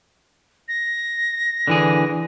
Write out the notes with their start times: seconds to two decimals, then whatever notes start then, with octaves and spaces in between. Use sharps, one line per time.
0.68 A#6
1.67 D3 E3 G#4